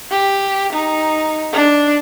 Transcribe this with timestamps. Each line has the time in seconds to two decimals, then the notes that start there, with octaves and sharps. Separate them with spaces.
0.11 G4
0.73 D#4
1.53 D4